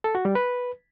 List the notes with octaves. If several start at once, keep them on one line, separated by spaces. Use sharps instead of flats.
A4
F#4
G3
B4